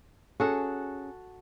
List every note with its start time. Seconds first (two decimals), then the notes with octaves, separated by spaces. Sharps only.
0.40 C#4 F#4 G#4 A4 F#5